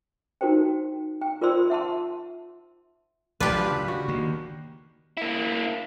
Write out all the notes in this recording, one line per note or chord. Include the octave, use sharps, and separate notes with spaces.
D#4 F#4 A#4 C5 G5
G5
F4 A#4 C5 D5 C6 E6
E5 F#5 A5 C6
A1 D2 F#3 D4 F4 G4 B4
C#3
F#4
D#3 A#3
A#3 E4